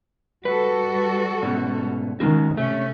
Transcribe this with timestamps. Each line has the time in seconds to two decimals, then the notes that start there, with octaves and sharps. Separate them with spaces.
0.45 G3 F#4 A4 B4
1.43 G#2 B2 C#4
2.20 D#3 G#3 C#4 F#4
2.57 C3 A3 C#4